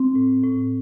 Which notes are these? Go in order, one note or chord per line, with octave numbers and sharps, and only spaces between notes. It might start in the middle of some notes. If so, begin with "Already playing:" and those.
Already playing: C4
A2
A2